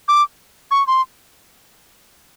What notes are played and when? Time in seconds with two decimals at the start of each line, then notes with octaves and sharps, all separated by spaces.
0.08 D6
0.71 C#6
0.87 C6